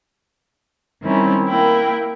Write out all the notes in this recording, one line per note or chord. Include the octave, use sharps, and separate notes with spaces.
D#3 G3 C4 C#4 E4
A#3 E4 A#4 G5